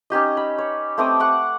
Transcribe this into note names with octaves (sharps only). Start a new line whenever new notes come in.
C#4 D#4 G4 D#5
B5
C#5
A3 C4 D6 D#6
F#5 C#6 D6